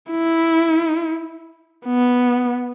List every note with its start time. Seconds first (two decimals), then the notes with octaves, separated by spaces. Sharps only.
0.11 E4
1.87 B3